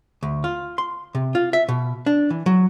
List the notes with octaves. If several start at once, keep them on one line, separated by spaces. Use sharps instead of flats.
D2
F4
C6
C3
F4
E5
B2
D4
E3
F#3